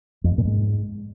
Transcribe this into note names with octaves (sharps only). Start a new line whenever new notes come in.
F2
G#2
A#2
G#2